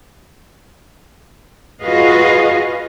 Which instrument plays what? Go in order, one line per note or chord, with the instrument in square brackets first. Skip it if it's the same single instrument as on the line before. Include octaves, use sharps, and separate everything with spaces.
[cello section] F4 F#4 G#4 B4 D#5 F5